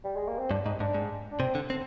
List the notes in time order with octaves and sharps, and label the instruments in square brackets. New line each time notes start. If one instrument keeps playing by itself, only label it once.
[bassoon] G3
G#3
A#3
C4
[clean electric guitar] G2 [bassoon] D4
[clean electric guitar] G#2 [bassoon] D#4
[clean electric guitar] G#2 [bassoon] D4
[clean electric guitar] G#2
[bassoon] D4
[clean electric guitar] C3 [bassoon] C4
[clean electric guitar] D3
C4